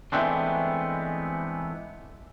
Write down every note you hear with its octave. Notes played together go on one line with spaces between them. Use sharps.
E3 G#3 A3 B3 C4 D4